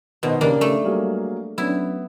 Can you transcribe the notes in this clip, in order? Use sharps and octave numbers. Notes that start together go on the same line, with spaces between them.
B2 D#3 B3 D#4 A#4 C5 D#5
C#3 A#3 D4 G4
A3 D#4
F#3 G3 A#3 G#4 F5
F#3 B3 C#4 D4 E4